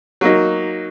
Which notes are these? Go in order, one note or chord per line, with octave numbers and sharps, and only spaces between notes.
F#3 A#3 D#4